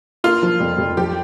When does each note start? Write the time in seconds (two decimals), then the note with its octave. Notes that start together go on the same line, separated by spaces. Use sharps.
0.24 A#3 F4
0.43 F3
0.60 F2
0.78 F2
0.97 F3 G4